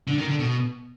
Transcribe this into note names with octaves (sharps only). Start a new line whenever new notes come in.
D3
D#3
D3
B2